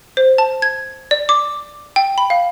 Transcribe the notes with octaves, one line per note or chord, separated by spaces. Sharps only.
C5
A5
G#6
D5
D6
G5
B5
F5